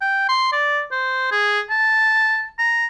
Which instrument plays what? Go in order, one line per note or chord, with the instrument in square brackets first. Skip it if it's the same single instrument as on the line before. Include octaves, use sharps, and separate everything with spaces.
[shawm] G5
C6
D5
C5
G#4
A5
A#5